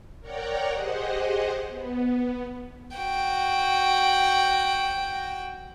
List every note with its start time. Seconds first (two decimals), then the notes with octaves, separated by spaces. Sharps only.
0.20 A#4 C#5 D5 F#5 G5 A#5
0.72 G4 G#4 C5 D#5 F#5
1.69 B3
2.97 F#4 G5